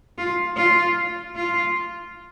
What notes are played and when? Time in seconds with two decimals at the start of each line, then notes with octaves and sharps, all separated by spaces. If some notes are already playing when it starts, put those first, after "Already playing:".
0.18 F4
0.57 F4
1.36 F4